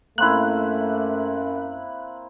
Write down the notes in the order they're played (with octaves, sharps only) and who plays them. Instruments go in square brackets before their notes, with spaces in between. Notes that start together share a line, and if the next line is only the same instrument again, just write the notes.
[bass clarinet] F#2 [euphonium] A3 [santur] A#3 C4 E4 [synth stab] F#6